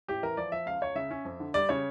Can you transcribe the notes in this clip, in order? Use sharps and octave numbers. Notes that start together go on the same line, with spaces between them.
A1 G4
E3 A#4
F3 D5
F3 E5
C#2 F5
C#2 C#5
C#3 E5
C#4
F2
D3
G3 D5
C#3 C#5